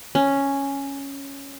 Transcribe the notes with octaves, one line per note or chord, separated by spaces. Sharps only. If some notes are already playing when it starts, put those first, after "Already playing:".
C#4